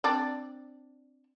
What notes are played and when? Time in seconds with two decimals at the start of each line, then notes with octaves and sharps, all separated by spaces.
0.04 C4 D4 D5